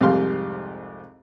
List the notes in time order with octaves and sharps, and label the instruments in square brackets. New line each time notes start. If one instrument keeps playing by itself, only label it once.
[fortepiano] C2 F2 G#2 G4 F5 C6